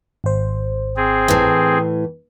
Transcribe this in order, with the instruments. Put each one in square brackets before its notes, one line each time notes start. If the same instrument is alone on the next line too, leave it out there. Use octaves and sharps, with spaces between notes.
[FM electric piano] G#1 C5
[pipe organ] C4 G#4
[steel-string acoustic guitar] A2 E3